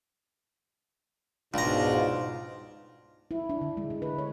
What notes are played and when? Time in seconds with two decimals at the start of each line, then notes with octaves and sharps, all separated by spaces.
1.54 C#2 G#2 B2 D4 F4 A#5
3.31 E4
3.49 D4
3.61 D3
3.77 G#3
3.90 D3
4.02 B4
4.18 C#5